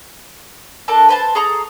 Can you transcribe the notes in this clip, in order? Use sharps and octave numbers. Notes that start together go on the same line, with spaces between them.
D4 A4 A#4 A5
B4 C5 A5
G#4 A4 A#5 C#6